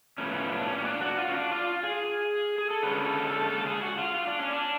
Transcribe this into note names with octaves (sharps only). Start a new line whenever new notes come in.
A2 F3 B3 C#4
C#4
D4
C#4
C#4
D4
F#4
F4
C#4
D4
F4
G#4
G#4
A4
D3 G#3 C#4 B4
A4
A4
A4
G#4
F#4
F4
F4
D4
C#4
D4